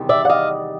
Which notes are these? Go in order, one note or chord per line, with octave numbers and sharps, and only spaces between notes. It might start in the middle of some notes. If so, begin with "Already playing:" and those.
Already playing: E2 C3 D#3 G3
D5 E5
F#5
D#5 F5